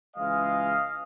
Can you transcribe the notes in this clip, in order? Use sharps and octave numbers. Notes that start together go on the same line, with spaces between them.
C#2 C#3 E3 G#3 D#5 F5